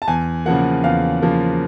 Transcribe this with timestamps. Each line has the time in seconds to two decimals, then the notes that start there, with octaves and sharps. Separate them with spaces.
0.02 A5
0.08 E2 G#5
0.46 C#3 F3 A#3 F#5
0.84 E2 F5
1.22 C#3 F3 A#3